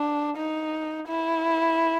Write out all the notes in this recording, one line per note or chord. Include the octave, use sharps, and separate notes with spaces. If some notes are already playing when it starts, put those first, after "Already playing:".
Already playing: D4
D#4
E4